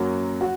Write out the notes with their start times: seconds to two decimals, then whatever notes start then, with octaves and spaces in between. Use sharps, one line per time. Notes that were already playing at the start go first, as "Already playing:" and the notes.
Already playing: F#2 F#3 A#3 F#4
0.41 F#4